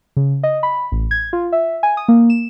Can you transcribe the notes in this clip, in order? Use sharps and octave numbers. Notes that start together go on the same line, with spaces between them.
C#3
D#5
B5
A1
G#6
F4
E5
G#5
D#6
A#3
E7